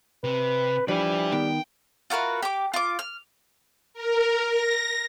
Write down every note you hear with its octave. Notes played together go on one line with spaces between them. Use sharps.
C3 B4
F3 G3 D4 E4 B4
D#3 B3 G5
F4 F#4 A#4 B4
G4 D6
F4 D6
F6
A#4
A#6